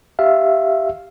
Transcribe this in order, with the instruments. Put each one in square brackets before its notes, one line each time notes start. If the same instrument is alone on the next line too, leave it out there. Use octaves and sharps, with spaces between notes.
[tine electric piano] G4 E5 F5